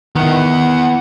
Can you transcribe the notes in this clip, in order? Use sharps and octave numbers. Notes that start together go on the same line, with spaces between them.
D#3 B3 E4 F#5